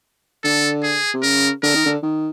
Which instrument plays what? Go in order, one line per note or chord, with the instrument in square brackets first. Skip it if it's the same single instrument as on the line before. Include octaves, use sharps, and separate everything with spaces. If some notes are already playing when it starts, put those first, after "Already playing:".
[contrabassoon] D3 [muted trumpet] A4
[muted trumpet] G#4
[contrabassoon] C3
[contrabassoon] C#3 [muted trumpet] A#4
[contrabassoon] D3 [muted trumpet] A#4
[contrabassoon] D#3
D3
D#3